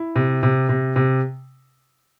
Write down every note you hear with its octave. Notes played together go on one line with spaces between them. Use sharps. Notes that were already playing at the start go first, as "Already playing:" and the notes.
Already playing: E4
C3
C3
C3
C3